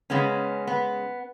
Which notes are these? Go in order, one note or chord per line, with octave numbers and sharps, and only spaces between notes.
C#3 G#3 B3 C#4
B3